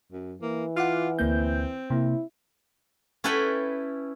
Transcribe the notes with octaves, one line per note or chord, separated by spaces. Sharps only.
F#2
E3 A#3
F4 F#5 D6 F6
D2 A#3 C4 G6
C3 A#3 E4
C#4 E4 A4 B4 G5 B5